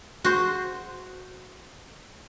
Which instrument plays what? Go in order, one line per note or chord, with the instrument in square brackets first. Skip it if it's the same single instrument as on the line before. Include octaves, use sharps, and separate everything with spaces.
[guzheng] F#4 C5